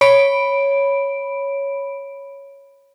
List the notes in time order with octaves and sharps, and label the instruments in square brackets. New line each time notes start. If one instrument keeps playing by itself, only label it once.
[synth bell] C#5 B5 D7